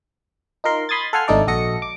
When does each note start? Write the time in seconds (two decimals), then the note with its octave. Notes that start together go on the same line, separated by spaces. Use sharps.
0.64 D#4 F4 A#4 C6
0.89 B5 C6 D#6 G#6 A6
1.13 A4 F5 F#5 G#5 C6 F6
1.28 G#1 A3 D4 D#4 A4 D5
1.47 A#1 F#4 A4 D#5 A#6 C#7
1.82 D6